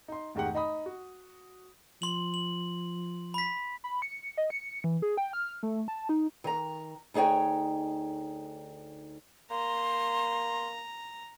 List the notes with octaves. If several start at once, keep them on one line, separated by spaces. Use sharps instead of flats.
D#4 C6
F1 G#2 D#3 G#3 G4 F#5
D#4 D#5 B5 D#6
F#4
F3 C6 F#7
F#7
B5 B6
B5
C#7
D#5
C#7
E3
G#4
G5
F6
A3
A5
D#4
D#3 A#5
D2 D#4 G#4 C#5 G5
A#3 A#5 C6